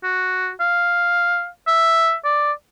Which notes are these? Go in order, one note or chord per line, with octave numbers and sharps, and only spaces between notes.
F#4
F5
E5
D5